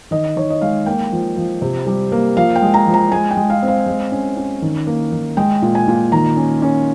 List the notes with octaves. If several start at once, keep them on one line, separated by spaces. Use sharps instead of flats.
D#3 D#5
D#3 C#5
D#5
G#3 F5
A#3 G5
F3
F3
C3
G3
A#3
F3 F5
G5
G#3
A#5
F3
A#5
G#3 G#5
G5
G#3
F5
C4
F5
G#3
C#4
C#4
D#3
A#3
D#3
G#3 G5
A#2
G#5
A#2
D#3 A#5
C#4
C#4